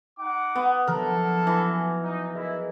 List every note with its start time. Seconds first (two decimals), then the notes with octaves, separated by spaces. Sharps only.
0.18 D#4 F#5 D6
0.55 B3
0.87 F3 F#3 B3 D4 E4 A4 A#4
1.47 E3
2.03 D#4
2.34 E4 G#4 A#4 D#5